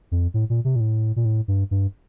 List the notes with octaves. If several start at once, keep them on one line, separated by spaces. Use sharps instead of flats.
F2
A2
A#2
C3
A#2
A2
A#2
A2
G2
G2